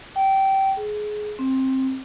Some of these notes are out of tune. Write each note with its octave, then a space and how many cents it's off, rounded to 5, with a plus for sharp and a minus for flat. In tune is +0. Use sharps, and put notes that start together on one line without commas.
G5 -20
G#4 +20
C4 +15